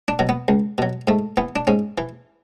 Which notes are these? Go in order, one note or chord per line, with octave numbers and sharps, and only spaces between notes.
D4
B2 F#3
B3
C#2
B2 F#3
G#2 A3
E3 B3
D4
G#2 C#4
E3